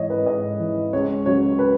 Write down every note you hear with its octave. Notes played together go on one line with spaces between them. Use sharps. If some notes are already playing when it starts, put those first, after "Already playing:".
Already playing: G#2 E3 C#5 D#5
B4
G#2 D#5
E3
C#2 C#5
C#3 F#3 C#5
B4